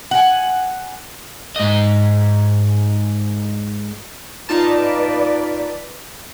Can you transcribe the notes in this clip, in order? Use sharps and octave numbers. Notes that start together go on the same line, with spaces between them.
F#5 G#5
G#2 D#5
D#4 F4 B4 D5 A5